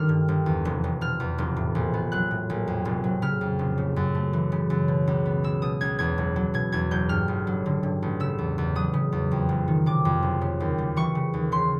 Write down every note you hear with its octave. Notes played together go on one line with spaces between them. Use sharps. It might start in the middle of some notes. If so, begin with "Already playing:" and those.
Already playing: G1 D#3 G3 F6
G2
G1
E2
F1
F1
B2 F6
E2
F1
A2
A#1
B3
F#3 F#6
A2
A#1
F2
F1
F#3
C#3 F6
F2
F1
C#3
F#2
A3
E3
C#3
F#2
B2
C#2
B3
G#3 E6
B2 D#6
C#2 G#6
E2 G#6
F#1
F#3
B2 G#6
E2 G#6
F#1 G6
G2 F6
A1
F#3
D3
G2
A1
C#3 E6
E2
E2
F#3 D#6
C#3
E2
F2
F#1
D#3
C3 D6
F2
F#1
C#3
D#2
G3
E3 C#6
C#3
D#2
C#3 C6